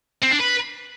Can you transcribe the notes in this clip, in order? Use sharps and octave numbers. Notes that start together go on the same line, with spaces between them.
C4
D4
B4